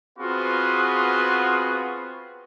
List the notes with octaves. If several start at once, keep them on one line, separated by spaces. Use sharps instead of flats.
B3 C4 F4 F#4 G#4 B4